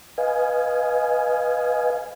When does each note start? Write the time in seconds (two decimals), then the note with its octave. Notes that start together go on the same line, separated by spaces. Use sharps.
0.18 B4 D#5 F5 G#5